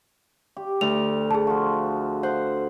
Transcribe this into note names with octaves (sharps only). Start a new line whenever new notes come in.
G4
D2 F7
G#4 A5
F3 F#4
C5 F#5